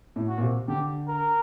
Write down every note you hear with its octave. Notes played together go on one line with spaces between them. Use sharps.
A2
F#4
A#2
C3
D3 G4
A#4